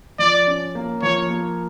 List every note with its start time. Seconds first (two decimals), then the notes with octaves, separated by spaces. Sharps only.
0.19 F3 D5
0.47 C#4
0.75 A#3
1.02 F3 C#5
1.30 A#3